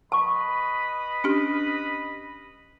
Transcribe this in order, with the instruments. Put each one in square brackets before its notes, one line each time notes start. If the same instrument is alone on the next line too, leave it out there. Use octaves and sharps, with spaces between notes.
[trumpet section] B4 D#5 B5 [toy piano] A5 C#6
[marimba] C#4 D4 G4